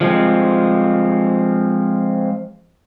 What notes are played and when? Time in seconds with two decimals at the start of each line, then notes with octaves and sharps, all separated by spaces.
0.01 F3 G#3 C4